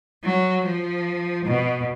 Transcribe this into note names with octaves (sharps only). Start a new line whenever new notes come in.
F#3
F3
B2